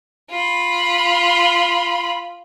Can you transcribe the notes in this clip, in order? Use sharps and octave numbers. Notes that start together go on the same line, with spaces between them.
F4 B5